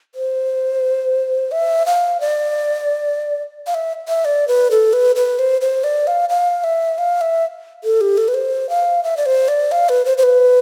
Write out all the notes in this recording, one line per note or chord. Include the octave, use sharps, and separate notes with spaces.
C5
E5
F5
D5
F5
E5
E5
D5
B4
A4
B4
B4
C5
C5
D5
F5
F5
E5
F5
E5
A4
G4
A4
B4
C5
F5
E5
D5
C5
D5
F5
B4
C5
C5
B4